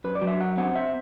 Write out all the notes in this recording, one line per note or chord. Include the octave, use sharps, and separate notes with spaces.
F#2 B4
D5
F#3
E5
F#2 F#5
C4 F#5
E5